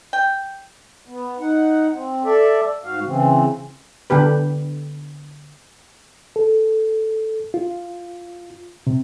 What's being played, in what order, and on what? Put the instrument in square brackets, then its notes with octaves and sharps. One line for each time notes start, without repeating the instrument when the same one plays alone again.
[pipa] G5
[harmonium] B3
D#4 F#5
C4
A4 D5 E5
G#2 F#4 F5
C#3 E3 C4
[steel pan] D3 B3 G4 B4
[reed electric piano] A4
F4
C3